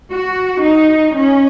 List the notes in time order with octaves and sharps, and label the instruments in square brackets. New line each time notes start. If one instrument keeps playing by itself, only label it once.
[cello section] F#4
D#4
C#4